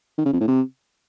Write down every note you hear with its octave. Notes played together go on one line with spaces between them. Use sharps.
D#3
C#3
F2
A2
C3